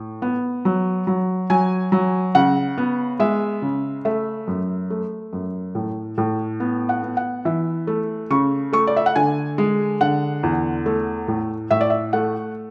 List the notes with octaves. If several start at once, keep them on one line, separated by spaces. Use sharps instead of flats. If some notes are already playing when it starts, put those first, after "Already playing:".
Already playing: A2
B3
F#3
F#3
F#3 G#5
F#3
C#3 F#5
B3
G#3 E5
C#3
A3 E5
F#2
A3
F#2
A2
A2
B3
F#5
B3
F#5
E3 E5
A3
C#3 C#6
A3 C#6
D5
E5
F#5
D3 G#5
G#3
D3 F#5
E2
A3
A2
A2 E5
D5
E5
A3 F#5